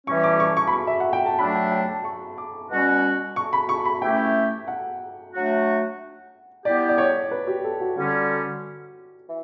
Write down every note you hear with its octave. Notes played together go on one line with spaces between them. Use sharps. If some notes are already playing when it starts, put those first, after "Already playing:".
E3 G3 C#4 C#6
D6
C#6
C#6
B5
C#6
E5
F#5
G5
A5
F#3 A3 D4 B5
G5
G5
A5
C#6
D6
B2 G3 C#4 F#4
C#6
B5
C#6
B5
E3 A3 C#4 E4 G4 G5
F#5
F#3 A3 D4 F#4
G3 B3 E4 G4 D5
D5
C#5
B4
G4
A4
F#4
D3 G3 C#4 F#4
E3